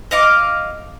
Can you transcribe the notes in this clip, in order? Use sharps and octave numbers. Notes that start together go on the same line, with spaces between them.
D#5 F5 D6